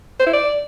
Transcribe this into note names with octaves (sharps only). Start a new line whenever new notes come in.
C5
E4
D5